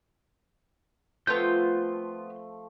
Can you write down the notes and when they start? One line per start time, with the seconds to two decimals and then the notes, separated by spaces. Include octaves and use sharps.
1.27 F3 A3 B3 C4 F4 C6 G6